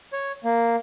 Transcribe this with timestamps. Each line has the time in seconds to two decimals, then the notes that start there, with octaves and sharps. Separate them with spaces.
0.13 C#5
0.44 A#3